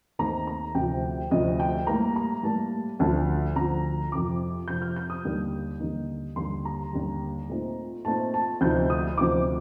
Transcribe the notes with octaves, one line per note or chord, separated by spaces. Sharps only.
D#2 D#3 A3 C4 D#4 A#5
A#5
D2 C3 F3 G5
D2 C3 F3 D#5
G5
A2 G3 A#3 A#5
A#5
A2 G3 A#3 A5
D2 D3 F3 A5
D2 D3 F3 A#5
F2 C3 F3 D6
F2 C3 F3 G6
F6
G6
D#6
D#2 D3 G3 A#3 D#4
D#2 D3 G3 A#3 D#4
D#2 D3 G3 C6
A#5
D#2 D3 G3
A#2 A3 C4 D#4
A#2 A3 C4 D#4 A5
A5
D2 C3 F3 C4 D#4 G6
D#6
D2 C3 F3 C4 D#4 D6